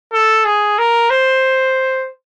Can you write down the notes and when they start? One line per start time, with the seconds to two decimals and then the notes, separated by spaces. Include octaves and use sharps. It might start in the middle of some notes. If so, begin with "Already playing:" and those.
0.13 A4
0.45 G#4
0.79 A#4
1.10 C5